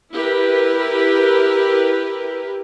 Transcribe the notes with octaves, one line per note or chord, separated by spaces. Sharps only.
E4 G4 A#4 B4